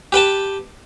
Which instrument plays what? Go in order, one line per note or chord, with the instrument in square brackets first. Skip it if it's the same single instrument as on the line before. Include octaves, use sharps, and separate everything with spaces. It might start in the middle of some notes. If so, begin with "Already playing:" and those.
[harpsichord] G4 B4 G5 A5